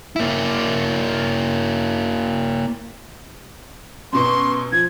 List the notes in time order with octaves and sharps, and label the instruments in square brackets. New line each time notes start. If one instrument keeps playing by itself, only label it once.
[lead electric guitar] A#3 E4
[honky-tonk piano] F#2 B2 C#6 [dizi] C6
[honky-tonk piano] F3 [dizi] G#6